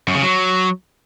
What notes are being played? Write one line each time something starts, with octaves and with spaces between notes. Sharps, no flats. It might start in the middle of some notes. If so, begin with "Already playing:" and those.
F#2
C#3
F#3